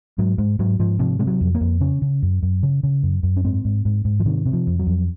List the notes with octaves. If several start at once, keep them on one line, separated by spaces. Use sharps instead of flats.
G#2 F#3
G#2 G#3
G#2 F#3
G#2 F3
C3 F3
C3 G#3
F#3
F2
A#3
F2
C#3 C#4
C#3
F#2
F#2
C#3
C#3
F#2
F#2
C#4
G#2 C4
G#2
G#2
G#2
F3
C3 D#3
C3
F3
F2
F#3
F2